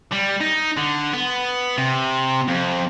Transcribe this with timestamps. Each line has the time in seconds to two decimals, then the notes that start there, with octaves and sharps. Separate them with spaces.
0.12 G3
0.41 D#4
0.77 D3
1.13 B3
1.78 C3
2.48 F2